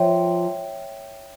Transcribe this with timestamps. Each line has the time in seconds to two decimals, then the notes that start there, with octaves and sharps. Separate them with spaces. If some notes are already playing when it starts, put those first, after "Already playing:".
Already playing: F3 C#5 E5 G5